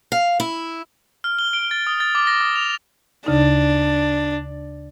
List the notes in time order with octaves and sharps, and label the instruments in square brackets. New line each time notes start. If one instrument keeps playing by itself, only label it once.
[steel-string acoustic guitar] F5
E4
[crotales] F6
G7
D7
A6
D#6
A6
D6
A#6
D#6
F7
[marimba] D2 C#3 D#4 [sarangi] D4